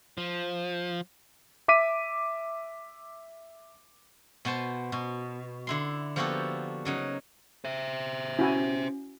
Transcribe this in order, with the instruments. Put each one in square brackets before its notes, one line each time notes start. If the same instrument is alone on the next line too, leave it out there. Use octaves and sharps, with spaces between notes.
[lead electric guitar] F3
[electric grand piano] E5 D6 B6 D#7
[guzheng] B2 B3 C5 A5
B2
D3 E4 C6
F3 A#3 B3 F#4 G4 A4
C#3 F#3 D#4
[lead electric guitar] C5 E5
[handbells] C#4 [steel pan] E4 F#4 G#5